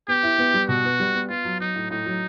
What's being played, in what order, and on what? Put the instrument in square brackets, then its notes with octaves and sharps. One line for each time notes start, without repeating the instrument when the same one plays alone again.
[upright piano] B3 [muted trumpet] G4
[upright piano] E4
B3
G3
[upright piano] B2 [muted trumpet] F#4
[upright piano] B3
G3
B3
[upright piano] B3 [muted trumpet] F4
[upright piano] F#3
[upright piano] F#3 [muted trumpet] D#4
[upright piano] A2
[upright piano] A2 [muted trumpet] D#4
[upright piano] F#3